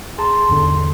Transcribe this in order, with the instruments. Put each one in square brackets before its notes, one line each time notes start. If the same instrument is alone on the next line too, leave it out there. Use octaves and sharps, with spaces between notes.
[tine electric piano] G#4 A5 A#5 [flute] C6
[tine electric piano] E2 G#2 D3